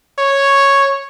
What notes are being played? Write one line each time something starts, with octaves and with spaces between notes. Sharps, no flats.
C#5